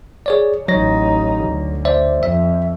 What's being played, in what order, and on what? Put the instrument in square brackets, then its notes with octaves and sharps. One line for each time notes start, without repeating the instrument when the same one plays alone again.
[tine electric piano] G#4 C#5 D5
[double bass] A1 D#4 [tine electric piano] F#3 C#5 A#6
[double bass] D2
[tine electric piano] C5 D5 E5
[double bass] F2 [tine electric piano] E5